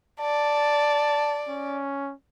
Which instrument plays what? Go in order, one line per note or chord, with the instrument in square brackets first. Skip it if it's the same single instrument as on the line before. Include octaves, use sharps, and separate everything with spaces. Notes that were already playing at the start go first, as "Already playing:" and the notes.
[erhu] D5 [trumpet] A5
[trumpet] C#4